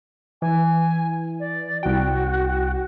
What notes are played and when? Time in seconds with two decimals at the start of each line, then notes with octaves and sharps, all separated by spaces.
0.42 E3 G#5
1.40 D5
1.83 C2 F#4 G5